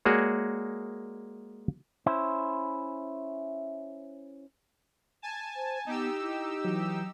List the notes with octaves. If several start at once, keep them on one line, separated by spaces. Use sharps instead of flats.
G#3 A#3 F#4 G#4 C#5 D5
C#4 E4 C5
G#5 A5
C5
B3 D#4 G4 E6
E4
E3 F#3